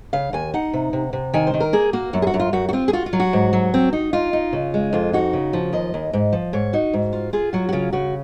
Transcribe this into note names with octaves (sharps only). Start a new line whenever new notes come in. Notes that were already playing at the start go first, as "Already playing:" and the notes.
C#3 F5
D#2 G#5
D#4 F#5
C3
C3
C3
D#3 G#5
C5
D#3
A#4
A#3 G#4
A#3 F#4
F#2 F#4
G#4
F#4
F#2
F4
F#2 F#4
F#4
C4 F4
G#4
F4 F#4
F4
F#3
F#4
G#2
F#3
C4
D#4
D#4 F4
D#4
C#3
G#3
F2 F4
D#4 F#4
C#3
F3
D#2 D#5
D#2
G#2
F3
G#2 C#5
D#4 F#4
G#2
F4
F4 G#4
F#3 F#4
F#4
C#3 F4
C#3 F#4